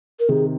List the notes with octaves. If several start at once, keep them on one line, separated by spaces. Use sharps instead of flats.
A#4
C3 D#3 G#4